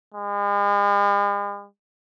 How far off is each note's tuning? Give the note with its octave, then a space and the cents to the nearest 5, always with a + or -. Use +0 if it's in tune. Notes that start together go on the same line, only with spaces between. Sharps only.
G#3 -45